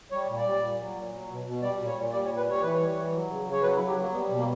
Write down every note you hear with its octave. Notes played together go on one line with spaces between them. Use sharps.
G3 C#5
A#2
D5
G3
A#2
F#3
A#2
F#3
B2
B2
G3 D5
A#2
C#5
A#2
G3 D5
C#5
A#2
B4
G3 C#5
E3 B4
C#5
G3
E3
F#3
C#3
C#3
C#5
F#3 B4
E4
F#3
G4
F#3 A#3
G3 B3
B2
A#3